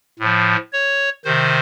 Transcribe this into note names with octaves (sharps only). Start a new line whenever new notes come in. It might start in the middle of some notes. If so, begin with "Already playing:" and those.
A2 F3
C#5
C3 D#3 C5